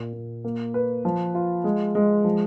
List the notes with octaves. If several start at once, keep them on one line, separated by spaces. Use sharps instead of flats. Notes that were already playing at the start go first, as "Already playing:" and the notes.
Already playing: A#2
A#2
A#3
B4
F3
F4
G#3
G#3
F3